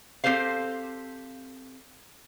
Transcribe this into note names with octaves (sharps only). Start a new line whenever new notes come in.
C4 G4 A4 C5 F5